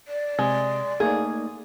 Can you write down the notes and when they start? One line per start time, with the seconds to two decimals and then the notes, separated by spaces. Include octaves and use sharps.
0.08 D5
0.39 C3 G#3
1.00 A3 A#3 D#4 G#4